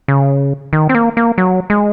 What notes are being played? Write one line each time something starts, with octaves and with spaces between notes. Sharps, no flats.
C#3
D#3
C4
A#3
A#3
F#3
G#3